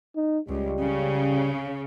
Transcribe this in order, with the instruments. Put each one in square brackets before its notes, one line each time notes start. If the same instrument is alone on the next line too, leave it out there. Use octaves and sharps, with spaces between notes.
[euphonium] D#4
[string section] C#2 [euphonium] G3
[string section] C#3